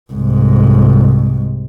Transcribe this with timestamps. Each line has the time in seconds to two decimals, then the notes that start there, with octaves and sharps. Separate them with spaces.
0.13 C2 G#2